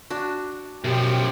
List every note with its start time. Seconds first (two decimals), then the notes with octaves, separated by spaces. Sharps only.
0.10 D4 F#4
0.84 F#2 B2 F3 G4